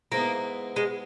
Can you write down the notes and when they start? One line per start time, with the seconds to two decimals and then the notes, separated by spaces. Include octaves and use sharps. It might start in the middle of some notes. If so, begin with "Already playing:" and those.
0.12 G#2 E3 A#3 B3
0.76 G#3